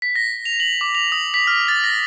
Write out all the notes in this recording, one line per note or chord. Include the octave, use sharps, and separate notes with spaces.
B6
A#6
F7
F#7
D6
F7
D#6
B6
F6
A6
A#6